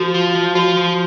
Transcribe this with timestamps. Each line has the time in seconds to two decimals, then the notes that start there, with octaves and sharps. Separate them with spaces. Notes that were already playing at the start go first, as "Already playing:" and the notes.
Already playing: F3 F#4
0.14 F4
0.35 F3
0.55 F4 F#4
0.77 F3